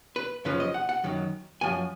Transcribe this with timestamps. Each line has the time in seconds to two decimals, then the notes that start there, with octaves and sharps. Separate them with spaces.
0.16 B4
0.45 F#2 C#3 F3 B4
0.60 D#5
0.74 F#5
0.89 F#5
1.04 F#2 D#3 F#3
1.61 F#2 F3 G#5